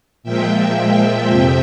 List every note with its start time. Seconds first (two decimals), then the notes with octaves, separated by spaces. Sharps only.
0.23 A#2 F3 G#3 E5 G5
1.28 F2 C3 F3